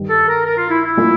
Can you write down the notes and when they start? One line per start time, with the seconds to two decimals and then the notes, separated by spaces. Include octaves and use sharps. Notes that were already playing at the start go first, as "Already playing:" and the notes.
Already playing: G2 D#3 G3
0.09 A4
0.28 A#4
0.45 A#4
0.58 F4
0.70 E4
0.83 E4
0.97 A#2 F3 A3